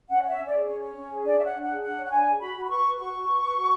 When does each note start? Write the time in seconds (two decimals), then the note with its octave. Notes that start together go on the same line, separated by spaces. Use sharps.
0.09 C#4 F#5
0.22 C#5
0.27 E5
0.37 C#4
0.47 D5
0.52 G#4
0.66 C#4 C#5
0.80 C#5
0.95 C#4
1.10 G#4
1.25 D4 D5
1.38 C#5 E5
1.44 F#5
1.54 D4
1.63 G#4 F#5
1.83 D4 F#5
1.97 C#5
2.05 F#5
2.11 D4 G#5
2.26 G#4
2.40 F#4 B5
2.55 F#4
2.65 B5
2.70 B4 C#6
2.84 B4
2.98 F#4 C#6
3.13 F#4
3.27 B4
3.42 B4
3.57 F#4